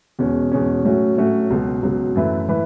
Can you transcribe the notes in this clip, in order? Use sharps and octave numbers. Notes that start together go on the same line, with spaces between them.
E2 B2 G#3 C#4
E2 B2 G#3 C#4
A2 F#3 A3 C#4 F#4
A2 F#3 A3 C#4 F#4
C#2 B2 F#3
C#2 B2 F#3
F#2 E3 A3 E4 B4
E3 A3 E4 B4